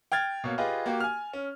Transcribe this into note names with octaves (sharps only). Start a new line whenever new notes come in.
G5 F6 G#6 A6
B2 A#3 C#5
F4 G4 G#4 B4 D#5
A#3 F#4 G4
G#5 F6
C#4